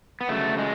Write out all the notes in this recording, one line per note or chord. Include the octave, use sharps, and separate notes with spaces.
B3
C#3 F#3 A3
G#3